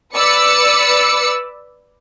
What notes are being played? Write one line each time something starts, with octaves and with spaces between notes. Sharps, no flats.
B4 D5 E6 C#7